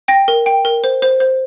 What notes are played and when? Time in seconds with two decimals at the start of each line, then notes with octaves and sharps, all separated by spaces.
0.08 G5 A#6
0.28 A#4
0.46 G5
0.65 A#4
0.84 C5
1.02 C5
1.20 C5